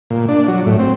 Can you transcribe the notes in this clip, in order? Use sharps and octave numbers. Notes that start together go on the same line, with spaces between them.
A#2
D4
F#3
A2
C4